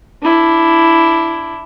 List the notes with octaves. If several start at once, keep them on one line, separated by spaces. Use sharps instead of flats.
D4 E4